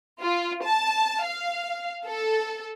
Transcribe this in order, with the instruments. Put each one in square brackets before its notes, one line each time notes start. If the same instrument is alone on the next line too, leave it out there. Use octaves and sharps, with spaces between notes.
[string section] F4
A5
F5
A4